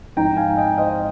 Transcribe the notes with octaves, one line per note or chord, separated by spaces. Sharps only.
G#2 F3 C4 D#4 G5 A#5
F5 G#5
D#5 G5
C5 D#5